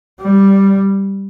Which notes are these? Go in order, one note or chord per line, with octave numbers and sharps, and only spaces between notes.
G3